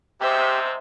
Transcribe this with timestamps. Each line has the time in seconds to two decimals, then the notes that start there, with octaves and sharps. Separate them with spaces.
0.20 G#2 C3 G4 C5 E5